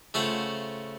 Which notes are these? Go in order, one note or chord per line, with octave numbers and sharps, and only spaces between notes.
C#3 A3 F4 C5 F#5